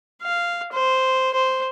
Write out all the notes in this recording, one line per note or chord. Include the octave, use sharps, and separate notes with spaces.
F5
C5
C5